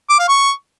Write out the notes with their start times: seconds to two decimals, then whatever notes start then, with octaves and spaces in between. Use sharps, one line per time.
0.10 D6
0.19 F5
0.29 C#6